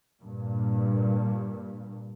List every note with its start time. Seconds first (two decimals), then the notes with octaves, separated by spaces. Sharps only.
0.21 G2 A#2